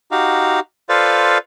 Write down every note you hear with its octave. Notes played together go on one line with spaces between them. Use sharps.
D#4 F#4 G4 F5
F4 A4 B4 C5 D5 F5